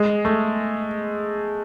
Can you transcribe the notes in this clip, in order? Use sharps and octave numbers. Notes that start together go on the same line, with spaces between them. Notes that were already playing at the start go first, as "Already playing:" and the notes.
Already playing: G#3
A3